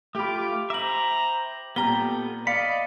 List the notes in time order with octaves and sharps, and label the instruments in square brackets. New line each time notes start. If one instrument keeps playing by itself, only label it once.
[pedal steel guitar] A3 F4 [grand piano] G4 B5 [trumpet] D6
[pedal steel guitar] C5 E5 [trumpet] A#5 [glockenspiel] D6 F#7
[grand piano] A#2 G3 A#5 [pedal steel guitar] B3 A4 [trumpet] G4 [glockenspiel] G7
[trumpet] D5 [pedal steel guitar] D#5 B5 [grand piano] F5 [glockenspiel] C#7